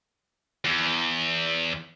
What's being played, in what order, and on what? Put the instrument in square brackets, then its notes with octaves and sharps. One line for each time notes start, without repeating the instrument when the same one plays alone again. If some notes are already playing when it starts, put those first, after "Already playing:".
[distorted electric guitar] E2